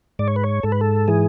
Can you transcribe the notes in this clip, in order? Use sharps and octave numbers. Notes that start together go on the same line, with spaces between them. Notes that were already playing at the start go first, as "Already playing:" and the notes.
G#2 D5
C#5
B4
C#5
G#2 A4
B4
A4
E3 G#4